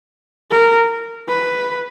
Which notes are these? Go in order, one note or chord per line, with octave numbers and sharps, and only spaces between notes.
A#4
B4